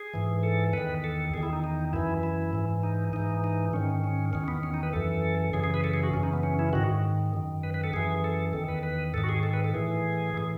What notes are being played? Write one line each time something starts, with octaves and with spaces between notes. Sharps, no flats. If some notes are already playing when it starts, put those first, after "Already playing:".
Already playing: G#4
G#2 E3
A4
E2 D#3 B4
A4
E2 D#3 G#4
E4
D#4
D#4
F#2 E3 E4
E4
G#2 E3
D#4
G#2 E3 D#4
D#4
G#2 D#3 C#4
C#4
E2 D#3 C#4
B3
C#4
D#4
B4
F#2 E3 A4
F#2 C#3 E3 G#4
G#4
B4
A4
G#4
F#4
F#2 C#3 E3 C#4
D#4
B3
C#4
E4
G#2 D#3 F#4
F#2 D#3
B4
B4
A4
F#2 E3 G#4
A4
E2 D#3 A4
B4
B4
G#2 D#3 A4
F#4
G#4
A4
B4
A4
A2 E3 G#4
A2 E3